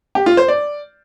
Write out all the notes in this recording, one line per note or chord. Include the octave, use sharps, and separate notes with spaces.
G4
F4
C5
D5